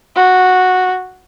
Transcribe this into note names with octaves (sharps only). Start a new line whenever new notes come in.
F#4